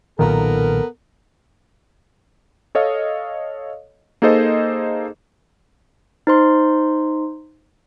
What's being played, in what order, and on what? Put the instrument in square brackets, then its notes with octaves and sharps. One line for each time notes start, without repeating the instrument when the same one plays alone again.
[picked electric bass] B1 A#2 D#3 [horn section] B3 A4 A#4
[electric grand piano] A4 C#5 D#5 F5
A#3 D#4 G#4 A4 C5 D#5
[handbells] D#4 C5 C6